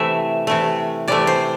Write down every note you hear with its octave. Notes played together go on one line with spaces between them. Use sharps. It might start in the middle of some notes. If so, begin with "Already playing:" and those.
Already playing: C3 E3 A3 E5
C3 E3 A3
C3 E3 A3 D5
C5